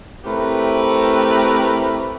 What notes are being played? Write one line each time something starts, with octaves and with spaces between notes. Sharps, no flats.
A3 C4 E4 G4 A#4 B4